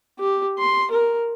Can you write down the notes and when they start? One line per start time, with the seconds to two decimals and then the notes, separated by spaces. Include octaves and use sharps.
0.20 G4
0.59 C6
0.91 A#4